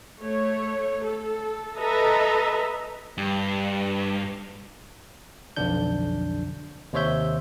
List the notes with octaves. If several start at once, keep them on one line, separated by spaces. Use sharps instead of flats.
A3 C#5
A4
A4 B4 D#5 E5 A#5
G2
B1 F2 D3 D4 G6
D#2 C3 C5 C#5 E5 G6